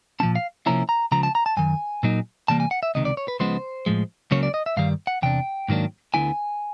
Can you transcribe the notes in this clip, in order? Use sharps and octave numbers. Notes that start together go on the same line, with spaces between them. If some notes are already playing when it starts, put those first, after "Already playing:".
A#2 F3 A3 C#4 A5
F5
C3 F3 A#3 C#4 E4 A#5
A#5
C#2 C#3 F3 A#5
A5
A#5
A5
F#2 D#3 G#5
A#2 F#3 A#3 D#4
C3 E3 G3 A#3 A5
G#5
F#5
E5
C#2 C3 D#3 D#5
D5
C#5
B4
C#2 C#3 F3 G#3 B3 C5
A2 F3 G#3
C#2 C#3 F#3 A#3 C#5
D5
D#5
E5
G2 D#3 G3 F5
F#5
E2 C3 D4 G5
G#2 D#3 F#3 A#3 D4
D2 D3 F#3 B3 E4 G#5